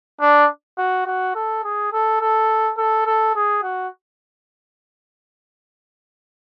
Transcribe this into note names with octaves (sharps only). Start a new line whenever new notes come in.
D4
F#4
F#4
A4
G#4
A4
A4
A4
A4
G#4
F#4